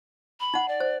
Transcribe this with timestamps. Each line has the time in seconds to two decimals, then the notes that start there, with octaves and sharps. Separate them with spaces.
0.40 B5
0.54 D#4 F#5
0.68 D5
0.80 C5